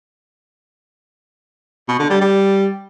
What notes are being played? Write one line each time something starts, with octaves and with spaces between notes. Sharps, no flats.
B2
D3
G3
G3